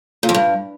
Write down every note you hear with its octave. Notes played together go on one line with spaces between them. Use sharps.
A#2
F2
G2